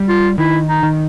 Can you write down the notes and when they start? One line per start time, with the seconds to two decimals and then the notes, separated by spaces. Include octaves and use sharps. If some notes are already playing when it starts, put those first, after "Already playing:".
Already playing: G3
0.09 F4
0.38 D#3 E4
0.68 D#4
0.83 D#3